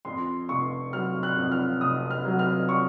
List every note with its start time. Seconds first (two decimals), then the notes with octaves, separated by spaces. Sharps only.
0.05 F2 C6
0.49 F1 C#6
0.93 F#3 F6
1.23 F#6
1.37 F2
1.52 F6
1.81 F1 D#6
2.11 F6
2.25 F#3
2.39 F6
2.69 C#6